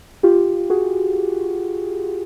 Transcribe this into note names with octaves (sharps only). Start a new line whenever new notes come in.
F4 G4
F#4 G#4